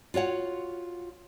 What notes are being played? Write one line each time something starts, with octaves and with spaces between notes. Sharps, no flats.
F4 F#4 C#5 F#5